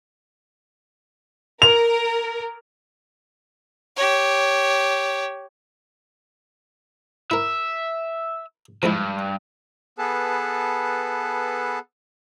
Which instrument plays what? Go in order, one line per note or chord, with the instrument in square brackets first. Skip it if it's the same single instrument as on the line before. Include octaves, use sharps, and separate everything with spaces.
[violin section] A#4 [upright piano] F7
[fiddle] G4 C#5
[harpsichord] E4 A#4 [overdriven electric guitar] E5
[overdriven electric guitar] E2 G2 [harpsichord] F3 G#3 E4
[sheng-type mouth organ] B3 G#4 A4 B4 A5